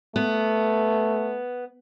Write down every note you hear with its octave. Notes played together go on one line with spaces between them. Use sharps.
A3 B3